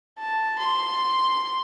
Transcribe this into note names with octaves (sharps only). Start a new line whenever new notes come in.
A5
C6